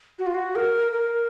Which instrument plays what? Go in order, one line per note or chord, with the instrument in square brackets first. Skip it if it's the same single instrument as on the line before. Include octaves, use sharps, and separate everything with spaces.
[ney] F#4
F4
F#4
A#4
A#4